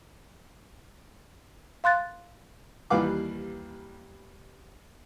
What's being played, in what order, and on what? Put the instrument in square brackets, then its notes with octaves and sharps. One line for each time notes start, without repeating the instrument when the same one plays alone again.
[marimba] F5 C6 F#6 A6
[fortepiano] D#2 E3 G3 B4 F5 D6